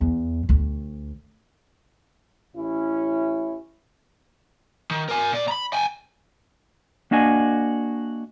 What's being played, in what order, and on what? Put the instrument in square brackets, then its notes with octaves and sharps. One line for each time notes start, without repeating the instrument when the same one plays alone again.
[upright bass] E2
D2
[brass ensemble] A1 C#4 E4
[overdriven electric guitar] D#3
A#4 G#5
A#2 D5
A#5 B5
G5 G#5
[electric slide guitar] A#3 D4 F#4 D#5 G#5